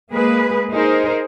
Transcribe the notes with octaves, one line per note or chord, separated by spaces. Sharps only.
G#3 A#3 G#4 B4
D#4 G#4 A#4 C5